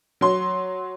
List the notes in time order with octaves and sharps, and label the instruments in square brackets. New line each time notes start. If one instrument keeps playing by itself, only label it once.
[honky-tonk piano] F#3 C6